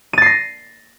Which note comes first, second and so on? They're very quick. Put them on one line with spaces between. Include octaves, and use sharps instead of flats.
D#7 A6 C7 A#6